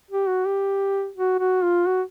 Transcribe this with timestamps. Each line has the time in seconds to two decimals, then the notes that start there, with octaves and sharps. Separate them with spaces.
0.11 G4
0.28 F#4
0.45 G4
1.16 F#4
1.39 F#4
1.63 F4
1.86 F#4